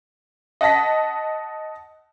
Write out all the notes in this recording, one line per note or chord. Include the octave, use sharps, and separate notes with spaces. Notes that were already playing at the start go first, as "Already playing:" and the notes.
D#5 F#5 A5 A#6 B6